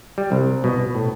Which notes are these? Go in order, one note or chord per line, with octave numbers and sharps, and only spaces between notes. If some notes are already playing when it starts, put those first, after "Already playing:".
G3
C2
B2
A2